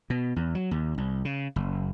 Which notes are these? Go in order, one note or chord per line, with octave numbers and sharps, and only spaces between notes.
B2
E2
F#3
D#2
C2
C#3
F#1